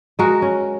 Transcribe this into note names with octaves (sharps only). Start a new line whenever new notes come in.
G#3 F#4 A#4
C#4